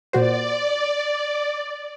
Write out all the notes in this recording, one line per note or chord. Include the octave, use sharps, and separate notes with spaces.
A#2 F#4 C5 D5